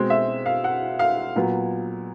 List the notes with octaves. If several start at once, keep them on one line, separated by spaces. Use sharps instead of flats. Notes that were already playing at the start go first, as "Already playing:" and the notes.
Already playing: B2 G#3 C4
E5
F5
F#5
F5
A#2 F#3 B3